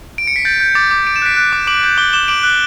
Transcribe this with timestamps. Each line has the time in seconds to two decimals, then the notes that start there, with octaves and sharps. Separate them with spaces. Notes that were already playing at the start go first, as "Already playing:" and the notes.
0.18 D7
0.27 C#7
0.36 B6
0.45 G6 A6
0.60 G6
0.75 D6 A6 C#7
0.91 D6
1.07 D6 D7
1.16 E7
1.22 F#6 B6 D7
1.37 F#6
1.53 D6
1.67 D6 D7 F#7
1.83 G6
1.98 D6 G7
2.13 D6 E7 G7
2.28 D6 D7 F#7
2.43 F#6